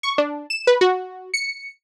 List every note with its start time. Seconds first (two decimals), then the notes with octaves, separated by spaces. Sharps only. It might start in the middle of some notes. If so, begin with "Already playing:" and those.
0.03 C#6
0.18 D4
0.50 E7
0.67 B4
0.81 F#4
1.34 C#7